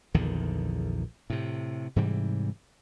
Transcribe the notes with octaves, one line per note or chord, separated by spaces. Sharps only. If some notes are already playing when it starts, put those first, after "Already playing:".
A#1 E2 D3 D#3
A2 C3
G#2 C3 E3 G3